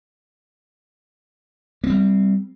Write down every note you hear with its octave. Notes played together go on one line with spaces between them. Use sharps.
G3 A#3 C4